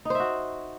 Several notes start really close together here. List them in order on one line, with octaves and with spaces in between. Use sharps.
D#4 C5 E5 F#4